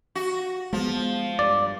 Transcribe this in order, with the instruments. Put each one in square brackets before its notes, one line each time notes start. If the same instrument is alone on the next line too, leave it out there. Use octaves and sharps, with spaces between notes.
[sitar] F#4
[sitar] F3 [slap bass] G#3 B3
[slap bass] G2 [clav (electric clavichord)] D5